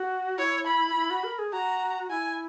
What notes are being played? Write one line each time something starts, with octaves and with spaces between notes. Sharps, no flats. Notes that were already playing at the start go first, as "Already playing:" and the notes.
Already playing: F#4
E4 C#5
B5
E4
F#4
A#4
G#4
F#4 A#5
E4 G#5